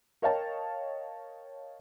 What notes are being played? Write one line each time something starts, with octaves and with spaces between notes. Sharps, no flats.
A#4 C#5 D#5 F5 G5 A5